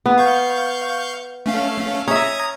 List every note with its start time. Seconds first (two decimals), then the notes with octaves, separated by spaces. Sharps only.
0.06 B3
0.18 F5 C#6 G6
1.46 A3 C#4 F5
2.08 C#4 E5 A#5 D#6 G#6